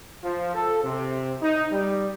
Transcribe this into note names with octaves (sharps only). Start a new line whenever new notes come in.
F3
A4
C3
D#4
G3